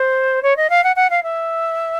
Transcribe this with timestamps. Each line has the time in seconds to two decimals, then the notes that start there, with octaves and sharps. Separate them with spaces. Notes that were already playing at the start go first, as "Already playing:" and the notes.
Already playing: C5
0.42 C#5
0.56 D#5
0.69 F5
0.83 F#5
0.96 F#5
1.10 F5
1.23 E5